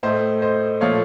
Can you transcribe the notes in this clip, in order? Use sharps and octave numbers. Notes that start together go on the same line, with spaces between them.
A2 A3 C5 D#5
C5 D#5
A#2 F3 A3 C#5 F5